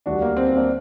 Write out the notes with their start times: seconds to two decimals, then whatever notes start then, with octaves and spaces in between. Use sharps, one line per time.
0.06 D2 D3 G3 D4 F#4
0.22 A#3
0.37 C4
0.47 C4
0.56 A#3 D4